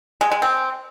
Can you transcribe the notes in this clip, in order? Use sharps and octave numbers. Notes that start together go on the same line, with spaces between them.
G#3
G#3
C4